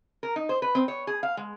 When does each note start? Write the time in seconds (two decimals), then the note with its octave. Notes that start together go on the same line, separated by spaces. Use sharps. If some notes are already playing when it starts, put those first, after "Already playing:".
0.23 A#4
0.36 D#4
0.49 C5
0.62 B4
0.75 C4
0.88 C#5
1.07 G#4
1.23 F5
1.37 G#3